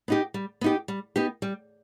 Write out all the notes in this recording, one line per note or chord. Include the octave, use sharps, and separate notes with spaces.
B3 D#4 G4
G3
B3 D#4 G4
G3
B3 D#4 G4
G3